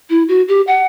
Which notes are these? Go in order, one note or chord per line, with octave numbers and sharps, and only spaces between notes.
E4
F#4
G4
F#5